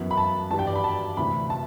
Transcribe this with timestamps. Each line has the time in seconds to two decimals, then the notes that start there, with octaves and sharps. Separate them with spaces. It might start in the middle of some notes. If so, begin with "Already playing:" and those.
Already playing: F#2 E3 B3
0.11 B5
0.17 A5
0.51 G2 E3 G3 A5
0.59 G5
0.67 D5
0.75 B5
0.84 A5
1.17 D2 C3 E3 B5
1.50 A5